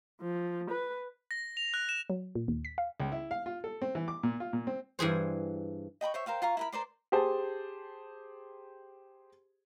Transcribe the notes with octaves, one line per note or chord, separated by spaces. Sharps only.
F3
B4
A#6
F7
F#6
E7
F#3
A#2
D#2
B6
F5
C#2
E4
F5
F4
A4
C4
E3
D6
A#2
F4
A#2
C4
G2 E3 G#4 C5
D#5 G5 B5 C#6
C5 C#5 E5
A#4 C5 F5 G5
F4 F5 A#5 C#6
E4 A#4 B5
A#4 C5 D5 C6
G4 G#4 C5 A5